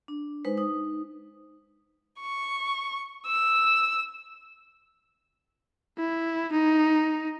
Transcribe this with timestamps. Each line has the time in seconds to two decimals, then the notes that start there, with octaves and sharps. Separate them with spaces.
0.08 D4
0.45 G#3 D#4 B4 C5
0.57 D#4 D#6
2.22 C#6
3.27 E6
5.98 E4
6.52 D#4